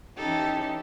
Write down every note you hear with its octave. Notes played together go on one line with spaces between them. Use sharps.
E3 C#4 D#4 G4 A4